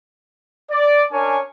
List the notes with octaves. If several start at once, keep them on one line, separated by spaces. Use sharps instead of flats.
D5
C#4 D4 A#4 C#5 G#5